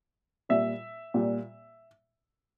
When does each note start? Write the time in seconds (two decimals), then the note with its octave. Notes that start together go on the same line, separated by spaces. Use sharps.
0.49 A#2 G3 E5
1.14 A#2 G3